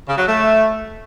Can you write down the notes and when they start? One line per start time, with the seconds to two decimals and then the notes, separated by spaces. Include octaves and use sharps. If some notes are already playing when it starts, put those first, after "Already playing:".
0.08 C#3
0.18 F#3
0.27 A3